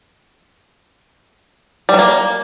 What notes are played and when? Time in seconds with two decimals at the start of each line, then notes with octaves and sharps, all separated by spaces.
1.89 G3
1.94 F#3
1.99 A#3